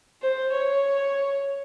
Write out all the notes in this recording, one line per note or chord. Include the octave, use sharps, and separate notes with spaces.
C5
C#5